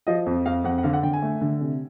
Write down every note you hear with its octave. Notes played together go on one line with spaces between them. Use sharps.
F3 D#5
F2
F2 F5
F2 F#5
F#5
D3 F5
F#5
D3 G5
G#5
A3
D3
C3